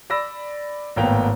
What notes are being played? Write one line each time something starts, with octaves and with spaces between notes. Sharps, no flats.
D5 B5 E6 A#6
G#1 A2 A#3 B3 G5 F7